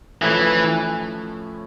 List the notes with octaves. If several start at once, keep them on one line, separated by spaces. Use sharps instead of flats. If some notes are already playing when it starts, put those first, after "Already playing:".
A2 E3 F3 A3 C#4